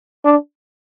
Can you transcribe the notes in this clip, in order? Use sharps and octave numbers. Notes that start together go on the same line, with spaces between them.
D4